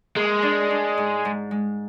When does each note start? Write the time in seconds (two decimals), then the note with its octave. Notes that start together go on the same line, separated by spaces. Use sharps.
0.16 G#3 A#3
0.43 D4
0.71 D4
0.98 G#2
1.25 G#2
1.51 G#3